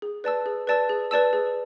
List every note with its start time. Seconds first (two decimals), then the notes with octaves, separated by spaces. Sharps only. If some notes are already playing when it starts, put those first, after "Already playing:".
0.02 G#4
0.24 B4 D5 A5 E6
0.46 G#4
0.67 B4 D5 A5 E6
0.89 G#4
1.11 B4 D5 A5 E6
1.33 G#4